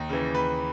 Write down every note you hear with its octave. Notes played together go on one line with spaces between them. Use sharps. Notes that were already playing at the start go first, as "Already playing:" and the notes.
Already playing: D#2
C#3 E3
D#2 B4